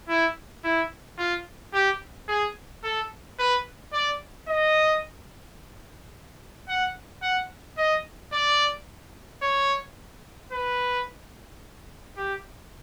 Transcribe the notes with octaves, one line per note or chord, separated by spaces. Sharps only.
E4
E4
F4
G4
G#4
A4
B4
D5
D#5
F#5
F#5
D#5
D5
C#5
B4
G4